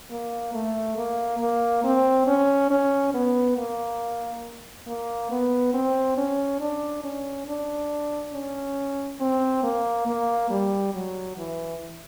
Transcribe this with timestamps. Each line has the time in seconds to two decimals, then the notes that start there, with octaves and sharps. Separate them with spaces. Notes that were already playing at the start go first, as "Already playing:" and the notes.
0.10 A#3
0.54 A3
0.97 A#3
1.40 A#3
1.84 C4
2.27 C#4
2.71 C#4
3.14 B3
3.57 A#3
4.87 A#3
5.31 B3
5.74 C4
6.17 C#4
6.61 D4
7.04 C#4
7.48 D4
8.34 C#4
9.20 C4
9.64 A#3
10.07 A#3
10.50 G3
10.94 F#3
11.37 E3